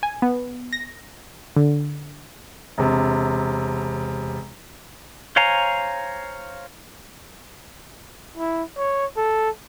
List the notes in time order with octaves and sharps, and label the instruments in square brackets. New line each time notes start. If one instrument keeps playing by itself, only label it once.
[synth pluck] G#5
B3
A#6
D3
[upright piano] E1 C3
[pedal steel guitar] C5 C#5 F5 G#5 A#5
[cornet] E4
C#5
A4